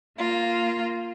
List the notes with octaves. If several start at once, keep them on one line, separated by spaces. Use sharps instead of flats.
A#3 F4